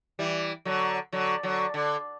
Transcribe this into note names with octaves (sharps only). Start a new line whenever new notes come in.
E3 G3
D3 F#3
D3 F#3
D3 F#3
D3